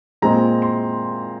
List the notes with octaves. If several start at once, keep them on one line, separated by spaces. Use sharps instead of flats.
A#2 G#3 C4 A#5
C6